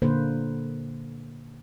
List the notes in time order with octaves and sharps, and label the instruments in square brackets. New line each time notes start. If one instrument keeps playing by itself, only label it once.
[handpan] A#2 D3 A#3 B4 C5